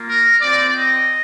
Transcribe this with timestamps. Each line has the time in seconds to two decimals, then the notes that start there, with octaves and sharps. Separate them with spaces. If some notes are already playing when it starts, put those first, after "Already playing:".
Already playing: A#3 F4
0.08 A#4
0.42 C4 F4 D5
0.76 D#5